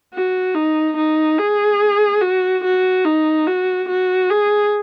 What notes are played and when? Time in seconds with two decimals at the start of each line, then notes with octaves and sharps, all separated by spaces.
0.14 F#4
0.55 D#4
0.97 D#4
1.38 G#4
2.21 F#4
2.64 F#4
3.05 D#4
3.47 F#4
3.89 F#4
4.30 G#4